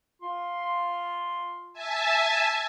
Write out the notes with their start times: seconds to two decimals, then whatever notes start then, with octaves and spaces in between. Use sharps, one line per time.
0.22 F4 C6
1.73 E5 G#5 A5